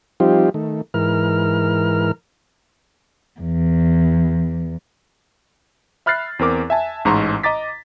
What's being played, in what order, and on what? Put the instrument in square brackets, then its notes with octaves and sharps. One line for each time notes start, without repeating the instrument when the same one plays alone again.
[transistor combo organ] F3 G3 C4 D#4 F4 G4
D#3 A3
G#2 E3 A#4 F6
[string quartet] E2
[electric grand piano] E5 B5 F6 F#6 A6 C7
E2 C4 A#4 D6
E5 G#5 A5
A1 G#2 A#5 C6 C#6
D#5 A#5 D6 A6 B6